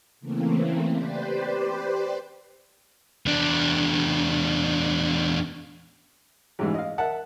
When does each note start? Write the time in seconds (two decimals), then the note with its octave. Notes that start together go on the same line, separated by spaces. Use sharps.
0.20 C#3 E3 A3 A#3 C4
0.92 G4 B4 C5 D5
3.26 E2 D4
6.59 A1 G#2 E3
6.74 D#5 F5
6.98 A#4 E5 F#5 A5